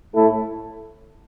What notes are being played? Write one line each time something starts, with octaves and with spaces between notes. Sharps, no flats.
A2 A3 E4 A4